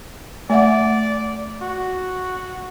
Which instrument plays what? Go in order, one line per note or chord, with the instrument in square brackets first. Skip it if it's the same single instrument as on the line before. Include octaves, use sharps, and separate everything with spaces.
[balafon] A3 E5 F#5 [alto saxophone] D5
[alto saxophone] F#4